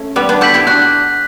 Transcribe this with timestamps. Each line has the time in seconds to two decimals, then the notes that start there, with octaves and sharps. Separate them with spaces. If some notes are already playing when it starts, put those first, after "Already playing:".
Already playing: A3 C#4
0.16 G3 B3 D6
0.29 B3 D4
0.41 F#4 A4 G6 B6 F#7
0.54 E4 G4
0.67 D4 F#4 F#6